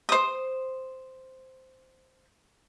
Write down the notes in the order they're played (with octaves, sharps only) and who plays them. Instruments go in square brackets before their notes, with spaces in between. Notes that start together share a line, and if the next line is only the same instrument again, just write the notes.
[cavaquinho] C5 D#6